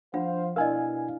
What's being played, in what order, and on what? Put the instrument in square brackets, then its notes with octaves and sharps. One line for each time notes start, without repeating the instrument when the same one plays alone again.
[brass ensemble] F3 C5 F5 [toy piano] D4 F4 [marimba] F#5
[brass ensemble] B2 [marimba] D4 E4 D5 [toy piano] A#4 D#5 [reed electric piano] F5 G#5